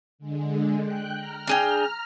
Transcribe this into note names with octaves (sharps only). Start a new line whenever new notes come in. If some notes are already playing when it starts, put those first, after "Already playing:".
D3 G#3
G5 F#6
A#5 F6
D4 G#4 G5